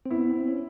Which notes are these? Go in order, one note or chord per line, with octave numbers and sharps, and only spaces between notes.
C4
B3 E4
C4
C4
C#4